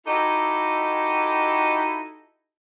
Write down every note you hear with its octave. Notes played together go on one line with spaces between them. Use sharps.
D#4 E4 F#4 G4 A4 D#5